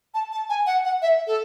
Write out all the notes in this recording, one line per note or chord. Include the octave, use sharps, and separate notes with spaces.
A5
A5
G#5
F#5
F#5
E5
A4